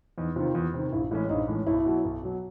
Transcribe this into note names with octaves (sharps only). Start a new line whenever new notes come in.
E2 D#4
C3 D#3 F4
E2
C3 D#3
A#1 E4
A2 E3 G#3 C#4 E4
A#1 D#4
A2 E3 G#3 C#4
B1 E4
B2 F#3
B1
B2 F#3